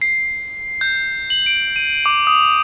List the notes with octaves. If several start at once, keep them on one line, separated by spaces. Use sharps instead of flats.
C7
G6
F#7
D7
D#7
D6
D#6